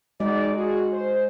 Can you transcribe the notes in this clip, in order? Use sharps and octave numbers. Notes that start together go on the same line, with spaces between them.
G#3 D#4 F#4 D5
F#4 G#4
C5